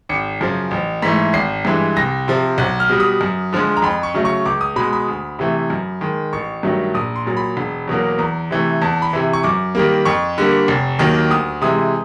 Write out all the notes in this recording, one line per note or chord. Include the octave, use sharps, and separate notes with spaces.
G#1 C#7
F#2 C#3 F3
A1
G#2 E3 A3 B6
G#1 C7
G2 E3 G#3
C2 A#6
C3 F3
B1 F#6
F6
B2 G3
D#6
F#2
D3 F3 G#3
A#5
F2 B5
C#6
C#3 F#3 A3
C#6
C#2 D6
D#6
B2 G#3 B5
B5
D2
C3 E3 A3
F#2
D#3 G#3
A1 C#6
G2 D#3 F#3 A3
A#1 D#6
C6
A#2 F#3
B5
E1
E2 B2 F#3 A#3
E2 A#5
C3 E3 A3
E2 A5
B5
C3 E3
C#6
F#2 D6
D#3 G3 A#3
F2 C#6
D3 G3 A#3
F1
D#2 D#3 F#3 A#3
D2 D#6
C3 E3 G#3 D#6